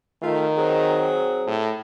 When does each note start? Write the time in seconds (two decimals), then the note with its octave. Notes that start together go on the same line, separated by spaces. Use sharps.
0.23 D#3 A3 F4
0.57 F#3 C4 G#4
1.47 A2